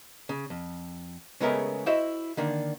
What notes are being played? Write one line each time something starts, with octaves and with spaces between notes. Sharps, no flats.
C#3
F2
C#3 G#3 A3 B3 C#4 A#4
E4 F#4 C5 D#5 E5
D3 D#3 A#3 D4